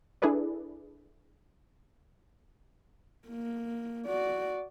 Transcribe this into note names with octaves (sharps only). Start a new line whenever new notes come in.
D4 E4 G#4 A4 B4 D5
A#3
F#4 D5